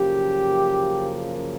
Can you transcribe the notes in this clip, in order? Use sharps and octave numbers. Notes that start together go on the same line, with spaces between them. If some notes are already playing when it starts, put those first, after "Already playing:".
Already playing: F#2 C#3 F3 A#3 G4